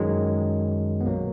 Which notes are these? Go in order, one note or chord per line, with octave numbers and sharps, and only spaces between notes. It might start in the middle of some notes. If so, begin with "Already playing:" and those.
Already playing: F#2 D#3 F#3 G#3
B3
B1 A#2 F#3 A#3